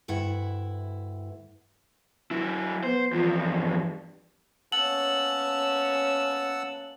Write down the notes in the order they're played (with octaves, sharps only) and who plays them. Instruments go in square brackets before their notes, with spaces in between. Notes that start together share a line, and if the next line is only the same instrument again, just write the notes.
[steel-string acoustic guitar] D2 G2 E4 F#5
[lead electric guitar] F#3 E4
[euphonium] B3 [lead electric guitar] C5
[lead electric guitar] E2 F3 [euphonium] F4
[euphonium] G2
[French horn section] A#3 B3 C#4 [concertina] F#5 A5 E6 [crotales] F#7